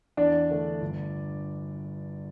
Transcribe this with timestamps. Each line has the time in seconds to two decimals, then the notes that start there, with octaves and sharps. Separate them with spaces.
0.17 E2 D4 D5
0.50 D3 A3 D4
0.81 G1